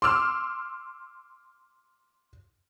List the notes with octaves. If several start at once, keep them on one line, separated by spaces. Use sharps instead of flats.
C6 D6 E6 F6